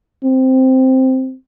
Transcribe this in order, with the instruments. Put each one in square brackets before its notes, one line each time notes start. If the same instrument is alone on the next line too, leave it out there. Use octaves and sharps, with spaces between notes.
[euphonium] C4